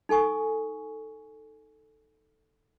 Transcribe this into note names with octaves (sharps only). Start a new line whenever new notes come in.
D#4 A4 G#5 C#6 D#6